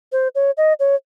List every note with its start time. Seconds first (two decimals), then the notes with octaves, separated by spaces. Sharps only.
0.12 C5
0.35 C#5
0.57 D#5
0.80 C#5